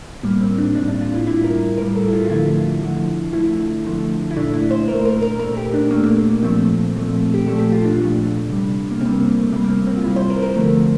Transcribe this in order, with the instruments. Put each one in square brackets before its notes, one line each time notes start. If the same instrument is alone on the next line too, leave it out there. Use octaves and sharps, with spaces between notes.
[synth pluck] A2 G3 A#3
C4
D4
A2 G3 D4
D4
F4
E4
A2 G3 E4
A#4
A2 G3 A#4
A4
E4
F4
F4
D3 F3 A3 E4
D3 F3 A3
D3 F3 A3 E4
D3 F3 A3
E4
A#2 A3 D4
E4
C5
A#2 A3 A#4
A#4
A#4
A#2 A3 A#4
G4
D4
A#2 A3 A#3
A#3
A#3
A#2 F3 A3 C4
A#2 F3 A3
G4
A#2 F3 A3 A4
G4
F4
D4
A#2 F3 A3
C3 G3
A#3
C3 G3 C4
A#3
A3
C3 A#3
G3
A#3
C4
C4
F4
C3 G3 E4
C5
A#4
A#4
D3 F3 A3